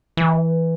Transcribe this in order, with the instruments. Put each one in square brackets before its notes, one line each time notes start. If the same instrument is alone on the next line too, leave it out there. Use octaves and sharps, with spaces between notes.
[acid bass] E3